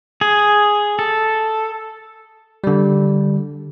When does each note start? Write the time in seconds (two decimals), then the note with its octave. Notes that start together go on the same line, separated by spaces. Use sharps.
0.21 G#4
0.99 A4
2.64 D3 G3